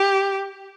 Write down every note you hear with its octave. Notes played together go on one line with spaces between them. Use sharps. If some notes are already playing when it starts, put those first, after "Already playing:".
Already playing: G4